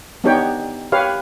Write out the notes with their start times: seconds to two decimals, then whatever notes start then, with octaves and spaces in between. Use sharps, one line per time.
0.24 B3 D4 D#4 G4 C#5 G5
0.92 G4 B4 C#5 F5